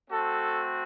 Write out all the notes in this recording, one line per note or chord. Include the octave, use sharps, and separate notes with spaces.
A3 C4 F#4 A4